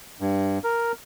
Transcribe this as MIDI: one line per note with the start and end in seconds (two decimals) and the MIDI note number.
0.21 0.58 43
0.64 0.92 70